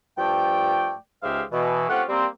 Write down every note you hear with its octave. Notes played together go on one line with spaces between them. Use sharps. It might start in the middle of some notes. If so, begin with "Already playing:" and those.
G2 F3 A3 D5 G5
C#2 G#2 G#3 G4 E5 F5
B2 E3
A3 C4 C#4 F4 G4 F#5
G3 A#3 C4